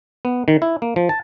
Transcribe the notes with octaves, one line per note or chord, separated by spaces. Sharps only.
B3
D#3
E4
A#3
F3
A5